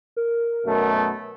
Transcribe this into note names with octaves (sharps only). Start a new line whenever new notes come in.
A#4
F#2 B2 A3